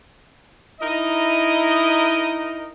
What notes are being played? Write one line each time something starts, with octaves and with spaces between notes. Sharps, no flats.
D#4 E4 A#4 D#5